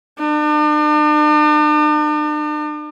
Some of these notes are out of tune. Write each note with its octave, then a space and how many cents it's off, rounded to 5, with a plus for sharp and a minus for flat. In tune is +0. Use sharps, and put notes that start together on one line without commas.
D4 +45